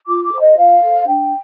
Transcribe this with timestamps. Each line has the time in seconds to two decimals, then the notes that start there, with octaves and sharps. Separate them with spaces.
0.07 F4 D6
0.24 D6
0.32 A4 C5
0.40 D#5
0.57 F4 F5
0.82 A4 C5
1.07 D4 G5